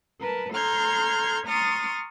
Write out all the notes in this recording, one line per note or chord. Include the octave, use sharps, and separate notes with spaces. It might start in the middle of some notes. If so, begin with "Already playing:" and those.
A#4 B4 A5
A4 A#5 C6 F6 G6 G#6
A#5 C6 C#6 D#6 F6 A6